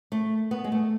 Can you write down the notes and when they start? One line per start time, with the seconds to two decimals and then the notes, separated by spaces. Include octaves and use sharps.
0.12 A3
0.51 B3
0.64 G#3
0.72 A3